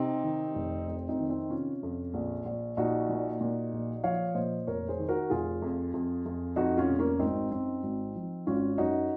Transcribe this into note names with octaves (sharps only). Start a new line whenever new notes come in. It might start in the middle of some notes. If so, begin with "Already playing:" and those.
Already playing: C3 C4 D#4
D#3
F1
F2 C4
C4 D#4
D#3
C4 D#4
C3 C#4 F4
F2
A#1
A#1
A#1 D#4 F#4
A#2
A#2
A#1
F3 C#5 F5
A#2 C5 D#5
F1 A#4 C#5
G#4 C5
D#3
F#4 A#4
F1 F4 G#4
F2
F2
F2
F2 D#4 F#4
C#4 F4
F1
A#3 C#4
G#1 C4 D#4
F#2 C4 D#4
G#1
F3
G#1 C#4 F4
F#2 D#4 F#4